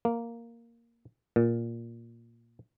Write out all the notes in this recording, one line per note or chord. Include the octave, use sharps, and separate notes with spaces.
A#3
A#2